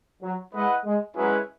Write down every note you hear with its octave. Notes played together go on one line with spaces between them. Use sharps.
F#3
G#3 E4 B4 D#5 F#5
G#3
F#3 G#3 C#4 E4 G#4 B4